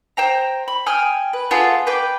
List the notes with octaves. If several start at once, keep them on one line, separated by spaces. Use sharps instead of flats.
C5 G5 A#5
B5
G5 G#5 D#6 F6
B4
B3 F4 G#4 A4
B4 G5 D6